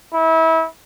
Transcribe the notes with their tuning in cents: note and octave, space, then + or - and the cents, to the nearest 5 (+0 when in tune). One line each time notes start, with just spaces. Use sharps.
E4 -30